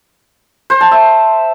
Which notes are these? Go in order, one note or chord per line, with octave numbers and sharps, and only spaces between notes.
C5
A5
E5